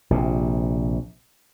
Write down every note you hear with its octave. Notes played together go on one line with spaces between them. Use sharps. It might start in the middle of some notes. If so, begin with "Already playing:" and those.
A#1 C3